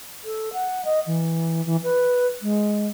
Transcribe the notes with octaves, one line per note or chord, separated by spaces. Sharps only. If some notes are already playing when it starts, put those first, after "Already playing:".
A4
F#5
D#5
E3
E3
B4
G#3